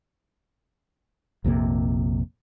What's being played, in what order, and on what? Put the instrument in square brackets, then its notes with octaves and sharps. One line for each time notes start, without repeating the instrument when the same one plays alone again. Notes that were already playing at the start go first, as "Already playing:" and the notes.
[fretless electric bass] A#1 F2 C3 A#3